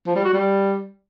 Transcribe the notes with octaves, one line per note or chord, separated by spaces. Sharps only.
F3
G3
F#4
G3